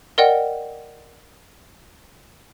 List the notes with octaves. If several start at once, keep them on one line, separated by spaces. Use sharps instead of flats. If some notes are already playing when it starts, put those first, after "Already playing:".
A#4 D5 D#5 F#5 G5